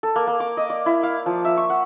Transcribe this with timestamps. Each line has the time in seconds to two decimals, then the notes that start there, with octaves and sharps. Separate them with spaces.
0.03 A4
0.16 A#3
0.27 A#3
0.40 D6
0.57 D#5
0.70 D5
0.86 E4
1.03 F5
1.26 F3
1.45 E5
1.57 C#6
1.70 F#5